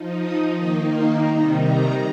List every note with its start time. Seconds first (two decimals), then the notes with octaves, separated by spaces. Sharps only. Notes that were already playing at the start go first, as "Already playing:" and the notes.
Already playing: F3 D#4
0.20 D#6
0.55 D#3 A#3 D#4 D#6
0.90 C6
1.25 C3 D#3 G3 D#4 A#5
1.61 A#5